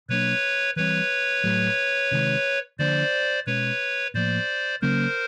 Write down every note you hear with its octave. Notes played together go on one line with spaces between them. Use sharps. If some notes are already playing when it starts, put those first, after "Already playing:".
B2 F#3 A#3 D4 B4 C#5
E3 G3 C4 B4 C#5
A2 F#3 A3
C3 D#3 G#3
D3 F3 A#3 D4 C5 D5
B2 G#3 C#4 B4 C#5
A2 F3 A#3 C5 D5
C#3 F#3 A#3 C#4 A#4 C5